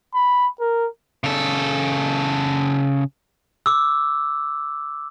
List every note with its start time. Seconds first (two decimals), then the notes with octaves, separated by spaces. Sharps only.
0.15 B5
0.60 A#4
1.24 C#3 A4
3.66 D6 E6